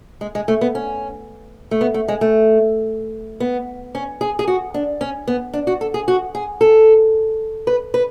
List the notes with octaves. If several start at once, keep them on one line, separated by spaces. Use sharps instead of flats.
G#3
G#3
A3
B3
C#4
A3
B3
A3
G#3
A3
B3
C#4
G#4
G#4
F#4
D4
C#4
B3
D4
F#4
A4
G#4
F#4
G#4
A4
B4
B4